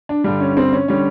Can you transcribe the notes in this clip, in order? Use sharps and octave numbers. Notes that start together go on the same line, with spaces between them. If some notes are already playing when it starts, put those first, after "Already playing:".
D4
G2 D3 G3 D4
C#4
C4
C#4
D3 G3 C#4